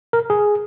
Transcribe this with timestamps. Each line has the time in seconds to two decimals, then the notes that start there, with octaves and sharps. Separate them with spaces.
0.13 A#4
0.30 G#4